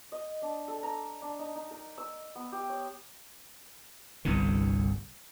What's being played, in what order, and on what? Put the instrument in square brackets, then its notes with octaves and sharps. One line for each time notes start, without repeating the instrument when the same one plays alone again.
[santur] D#5
D4
A4
A#5
D4
D#4
D#4
A#4
E6
B3
G4
C#5
[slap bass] G1 C2 G2 D3